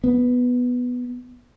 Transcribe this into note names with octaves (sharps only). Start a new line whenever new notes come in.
B3